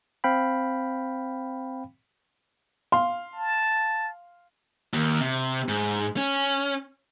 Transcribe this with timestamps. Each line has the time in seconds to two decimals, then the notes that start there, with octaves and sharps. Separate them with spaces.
0.24 C4 F5 G5 B5
2.92 F5 C6
3.34 A5
4.93 D#2
5.20 C3
5.68 G#2
6.17 C#4